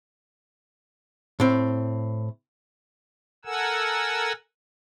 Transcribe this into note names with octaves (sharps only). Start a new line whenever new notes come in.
A2 C4
A4 A#4 F#5 G#5 E6